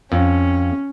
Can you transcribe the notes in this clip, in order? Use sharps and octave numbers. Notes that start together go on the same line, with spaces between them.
F2 C#4